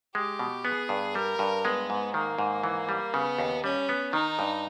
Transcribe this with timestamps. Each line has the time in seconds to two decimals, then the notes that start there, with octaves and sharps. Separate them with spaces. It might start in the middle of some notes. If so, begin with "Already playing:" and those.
0.15 G#3 G4
0.39 B2
0.64 B3 G#4
0.89 G2
1.15 G3 A#4
1.39 G2
1.65 G#3 B3
1.90 G#2
2.14 D#3 A#3
2.39 G#2
2.63 E3
2.89 G3
3.14 C#3 B3
3.39 D#2
3.64 G3 C#4
3.89 B3
4.13 D#3 D#4
4.39 G2